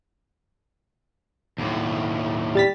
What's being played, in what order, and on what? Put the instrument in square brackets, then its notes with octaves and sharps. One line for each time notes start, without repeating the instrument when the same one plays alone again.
[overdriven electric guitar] D#2 A2
[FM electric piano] G3 A6 B6